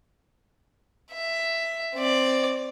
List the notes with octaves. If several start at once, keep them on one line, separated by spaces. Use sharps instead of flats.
E5
C4 D5